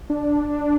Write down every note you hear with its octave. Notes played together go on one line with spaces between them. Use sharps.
D4